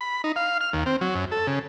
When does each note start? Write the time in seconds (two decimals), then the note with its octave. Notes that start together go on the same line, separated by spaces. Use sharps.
0.01 B5
0.24 D#4
0.36 F5
0.61 F6
0.73 D#2
0.86 C4
1.01 F#3
1.15 F#2
1.32 A4
1.47 C#3